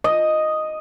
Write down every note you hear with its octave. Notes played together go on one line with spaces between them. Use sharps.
D#5